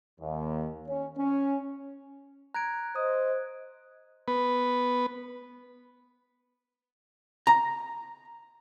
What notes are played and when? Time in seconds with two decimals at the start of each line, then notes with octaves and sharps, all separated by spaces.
0.20 D#2
0.87 C#4
1.17 C#4
2.54 A#5 F#6 G#6 D7
2.96 C5 D#5 D#6
4.28 B3 B4
7.47 A#5